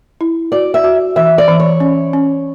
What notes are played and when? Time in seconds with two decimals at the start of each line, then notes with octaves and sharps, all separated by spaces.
0.21 E4
0.52 F#4 D5
0.74 E5
0.84 F#4
1.16 E3 E5
1.38 D5
1.48 E3
1.60 C#5
1.80 C#4
2.13 C#4